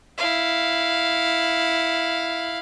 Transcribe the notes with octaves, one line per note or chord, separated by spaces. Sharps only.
E4 F5